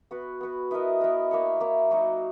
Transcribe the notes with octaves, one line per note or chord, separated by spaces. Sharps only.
B3 F#4 B4
B3 F#4 B4
B3 E4 A#4 D#5
B3 E4 A#4 D#5
A#3 E4 A#4 C#5
A#3 E4 A#4 C#5
F#3 A#3 D#4